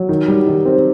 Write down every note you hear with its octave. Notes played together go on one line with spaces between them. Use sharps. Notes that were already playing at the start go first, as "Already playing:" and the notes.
Already playing: F#3
D#3
G3
D#3
C4